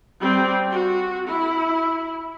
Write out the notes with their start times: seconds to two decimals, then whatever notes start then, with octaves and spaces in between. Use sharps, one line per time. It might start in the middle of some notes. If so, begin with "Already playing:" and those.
0.21 G3 C4
0.70 F#4
1.28 E4